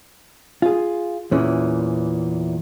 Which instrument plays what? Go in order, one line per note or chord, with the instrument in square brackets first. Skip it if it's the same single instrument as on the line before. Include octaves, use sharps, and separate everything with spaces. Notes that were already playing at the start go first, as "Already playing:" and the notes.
[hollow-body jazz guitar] F4 G#4
E2 A#2 E3 C#4